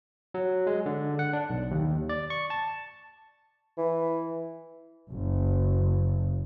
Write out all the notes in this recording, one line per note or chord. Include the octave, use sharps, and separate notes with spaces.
F#3
G#3
D3
F#5
D4
B1
D#2
D5
C#6
A5
E3
F#1